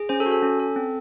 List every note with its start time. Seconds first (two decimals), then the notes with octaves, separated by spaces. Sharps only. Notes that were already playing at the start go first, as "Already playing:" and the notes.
Already playing: G#4
0.09 C#4 C5
0.20 A4
0.26 F#4
0.31 A4
0.43 C#4
0.59 A4
0.76 C4